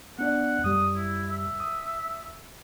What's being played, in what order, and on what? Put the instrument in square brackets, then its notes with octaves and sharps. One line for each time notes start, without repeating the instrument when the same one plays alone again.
[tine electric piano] B3 D4 D5 [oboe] F#5
[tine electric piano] F#2 G3 [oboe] D#6
[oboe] E4
E5
[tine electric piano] D#6